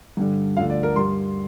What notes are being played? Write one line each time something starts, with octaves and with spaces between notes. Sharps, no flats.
G2 D3 G3
D2 D3 F3 F5
D5
A#4
G2 G3 C6